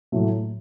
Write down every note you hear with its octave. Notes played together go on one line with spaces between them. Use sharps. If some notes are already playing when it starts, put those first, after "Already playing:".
A2 F#3 A3